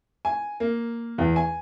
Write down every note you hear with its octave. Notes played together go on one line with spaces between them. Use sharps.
G#5
A#3
E2
G#5